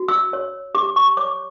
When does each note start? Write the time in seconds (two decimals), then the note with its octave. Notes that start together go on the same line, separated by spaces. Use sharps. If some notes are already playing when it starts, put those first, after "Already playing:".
Already playing: F#4
0.08 E6
0.33 C#5
0.74 G4 D6
0.96 C#6
1.17 C#5 D6